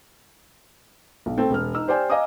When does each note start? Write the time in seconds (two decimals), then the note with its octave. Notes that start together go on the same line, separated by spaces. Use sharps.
1.26 B1
1.37 A3 C4 A4
1.50 E1 F6
1.75 D#4 E6
1.88 G4 C5 D5 G5 G#5
2.10 D#5 F5 G#5 A#5 D6 D#6